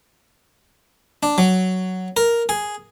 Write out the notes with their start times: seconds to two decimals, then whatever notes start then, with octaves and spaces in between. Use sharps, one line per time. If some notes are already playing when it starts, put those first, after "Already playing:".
1.23 D4
1.38 F#3
2.17 A#4
2.49 G#4